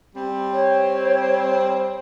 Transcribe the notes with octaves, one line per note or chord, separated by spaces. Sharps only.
G3 C4
C#5